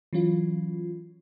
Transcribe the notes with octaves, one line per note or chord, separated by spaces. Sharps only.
E3 F#3 C#4 F4